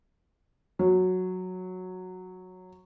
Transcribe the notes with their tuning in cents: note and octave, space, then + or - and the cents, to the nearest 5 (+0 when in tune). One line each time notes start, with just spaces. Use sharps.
F#3 -10